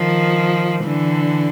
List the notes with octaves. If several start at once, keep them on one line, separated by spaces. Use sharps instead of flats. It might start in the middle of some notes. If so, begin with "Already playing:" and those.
Already playing: D#3 F3
D3 E3